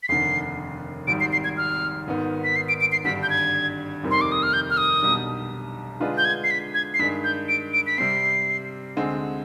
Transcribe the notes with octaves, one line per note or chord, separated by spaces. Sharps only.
B6
F1 D#2 D3 C7
G#1 G#2 G3 D7
C7
C7
G#6
F6
G#1 G#2 D#3 B3
B6
C7
D7
D7
C7
G#1 G2 D3 G3 B6
G6
G#6
F1 D#2 D#3 G3 C4
C6
D6
D#6
F6
G6
F6
D#6
B1 B2 G3 D4
D3 G#3 D4 F4 B4
G6
G#6
C7
B6
G#6
C7
G2 D#3 G#3 B6
G6
D7
D7
B6
C3 G3 C4 C7
D2 D3 G#3 C4